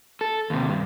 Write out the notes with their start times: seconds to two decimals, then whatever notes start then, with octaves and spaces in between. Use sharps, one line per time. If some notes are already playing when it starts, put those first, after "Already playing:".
0.21 A4
0.50 D#2 C3
0.69 G2